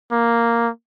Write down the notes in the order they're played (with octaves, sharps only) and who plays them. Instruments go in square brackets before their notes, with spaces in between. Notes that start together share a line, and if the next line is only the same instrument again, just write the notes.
[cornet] A#3